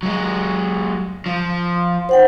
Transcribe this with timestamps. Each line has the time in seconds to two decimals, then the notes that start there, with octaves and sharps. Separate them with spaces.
0.03 F#3 G#3
1.26 F3
2.09 C5 F#5 G5